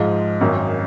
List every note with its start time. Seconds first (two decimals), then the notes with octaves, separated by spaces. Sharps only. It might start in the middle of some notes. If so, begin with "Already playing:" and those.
Already playing: G#2 F3 G#3 F5
0.41 G#1 F#2 D#3